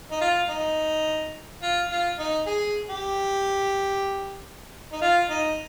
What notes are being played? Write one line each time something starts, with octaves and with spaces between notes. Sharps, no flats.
D#4
F4
D#4
F4
F4
D#4
G#4
G4
D#4
F4
D#4